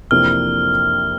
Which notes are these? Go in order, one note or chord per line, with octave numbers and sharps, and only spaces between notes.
F2 C3 E3 A#3 D4 F6